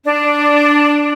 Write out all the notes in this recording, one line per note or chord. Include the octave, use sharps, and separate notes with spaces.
D4